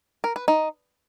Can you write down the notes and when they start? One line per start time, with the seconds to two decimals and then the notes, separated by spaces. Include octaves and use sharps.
0.24 A#4
0.36 B4
0.48 D#4